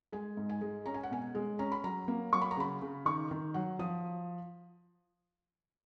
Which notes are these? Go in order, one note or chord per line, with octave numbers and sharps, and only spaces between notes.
G#3 G#5
G#2
G#5
G#3
C#4 A#5
G#5
F#5
B2 G#5
G#3
C#4 A#5
B5
F#3 A#5
A#3
F#3 C#6
B5
A#5
C#3 B5
C#3
D#3 C#6
D#3
F#3 F#5
F3 D#6